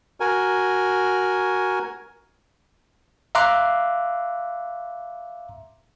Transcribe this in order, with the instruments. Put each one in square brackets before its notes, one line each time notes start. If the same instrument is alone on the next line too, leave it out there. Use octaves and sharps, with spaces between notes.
[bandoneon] F#4 A#4 G#5
[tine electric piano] E5 F5 A#5 C6 D6 F#6